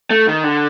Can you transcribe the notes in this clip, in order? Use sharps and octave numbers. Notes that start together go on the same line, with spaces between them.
A3
D#3
D3